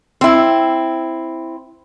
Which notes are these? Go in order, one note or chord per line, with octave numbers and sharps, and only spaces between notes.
C4 E4